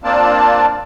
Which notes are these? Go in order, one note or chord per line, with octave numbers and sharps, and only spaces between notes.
A#3 C4 D4 F4 D5 A5